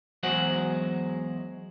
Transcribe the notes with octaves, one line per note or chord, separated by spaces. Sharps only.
E2 F#3 G#3 G#4 C5 F#5